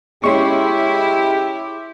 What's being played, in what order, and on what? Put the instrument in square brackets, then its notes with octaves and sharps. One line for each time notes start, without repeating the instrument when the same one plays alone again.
[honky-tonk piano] G#3 C#4 [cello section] E4 [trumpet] G4 [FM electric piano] C6 C#6